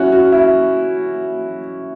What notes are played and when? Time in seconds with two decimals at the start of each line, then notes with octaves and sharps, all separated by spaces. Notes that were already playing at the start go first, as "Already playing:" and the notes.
Already playing: C#4 E4 F#4
0.12 F#4
0.32 E4